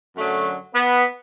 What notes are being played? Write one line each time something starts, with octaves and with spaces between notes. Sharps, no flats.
F#2 D3 F#3 A3
B3